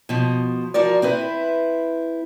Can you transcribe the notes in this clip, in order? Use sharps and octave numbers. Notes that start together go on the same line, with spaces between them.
B2 F3
F3 F#4 A#4 D5
C4 E4 B4